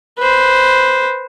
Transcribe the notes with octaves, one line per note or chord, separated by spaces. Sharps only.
B4 C5